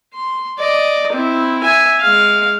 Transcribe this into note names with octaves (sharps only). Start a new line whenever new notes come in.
C6
D5 D#5
C4 E4
E5 G#5
G#3 F5